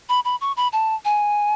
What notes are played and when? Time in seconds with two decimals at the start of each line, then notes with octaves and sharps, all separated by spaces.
0.09 B5
0.25 B5
0.41 C#6
0.57 B5
0.73 A5
1.05 G#5